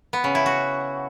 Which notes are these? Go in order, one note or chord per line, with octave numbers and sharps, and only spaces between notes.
B3
C#3
E4
F#4